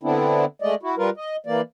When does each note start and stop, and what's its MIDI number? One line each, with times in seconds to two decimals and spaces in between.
0.03 0.45 50
0.03 0.45 59
0.03 0.45 60
0.03 0.45 62
0.03 0.45 64
0.62 0.75 56
0.62 0.75 57
0.62 0.75 74
0.62 0.75 75
0.83 0.95 64
0.83 0.95 66
0.98 1.10 55
0.98 1.10 65
0.98 1.10 70
0.98 1.10 71
1.17 1.36 75
1.46 1.61 52
1.46 1.61 58
1.46 1.61 74